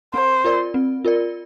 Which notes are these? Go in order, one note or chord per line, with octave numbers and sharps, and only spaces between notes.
C4 C5
F4 A#4 D5
C4
F4 A#4 D5